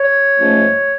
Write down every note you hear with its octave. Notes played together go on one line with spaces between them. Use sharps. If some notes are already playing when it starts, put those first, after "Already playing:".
Already playing: C#5
G#2 F3 A3 C#4